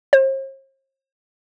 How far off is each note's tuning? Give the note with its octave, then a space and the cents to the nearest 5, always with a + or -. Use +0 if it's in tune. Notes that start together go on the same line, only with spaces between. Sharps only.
C5 +45